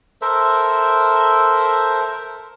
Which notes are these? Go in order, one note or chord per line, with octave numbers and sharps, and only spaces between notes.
A4 A#4 C5 E5